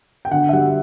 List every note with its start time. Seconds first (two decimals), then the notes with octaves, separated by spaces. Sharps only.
0.25 G5
0.31 D3 F#5
0.49 E5
0.53 G3 F#5